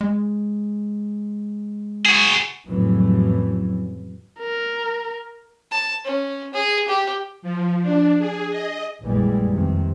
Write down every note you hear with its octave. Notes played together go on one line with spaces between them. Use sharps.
G#3
F#4 G#4
F2 A2 C#3 E3 F#3 G3
A#4
A5
C#4
G#4
G4
F3
D4
G#4
D#5
A#1 F#2 A#2 E3 G3 G#3
F2 C3 D#3